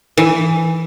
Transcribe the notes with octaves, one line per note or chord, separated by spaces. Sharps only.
E3